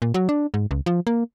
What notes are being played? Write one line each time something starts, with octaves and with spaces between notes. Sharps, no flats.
A#2
F#3
D4
G#2
C#2
F3
A#3